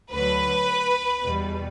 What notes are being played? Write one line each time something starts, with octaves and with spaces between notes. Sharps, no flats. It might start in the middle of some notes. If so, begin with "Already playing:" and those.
D2 D3 F#3 B4
E2 B2 G3